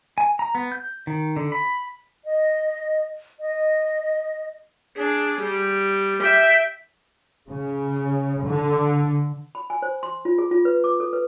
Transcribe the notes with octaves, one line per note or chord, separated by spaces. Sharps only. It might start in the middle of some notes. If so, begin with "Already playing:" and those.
G#5
A#5
B3
G6
D#3
D3
B5
D#5
D#5
D4 G#4
G3
E5 G5
C#3
D3
B5
G#5
C5
C6
F4
G#4
F4
B4
D6
A4
B4